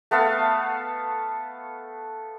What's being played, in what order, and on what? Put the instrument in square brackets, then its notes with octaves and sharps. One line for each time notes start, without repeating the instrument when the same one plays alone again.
[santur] A3 B3 A4 F5